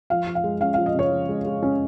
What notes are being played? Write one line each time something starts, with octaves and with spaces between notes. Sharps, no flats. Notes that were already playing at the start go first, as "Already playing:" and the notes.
F3 F5
F3
F5
G#3
C#4 F5
F3 F5
D#5
C#3 C#5
F3
G#3
G#3
C#4